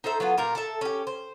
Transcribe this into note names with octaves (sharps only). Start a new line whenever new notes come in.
D#4 A4 C5 E5
F#3 B3 F4
A#2 G4 A#4 F5
A4 E5
C#4 G4
C5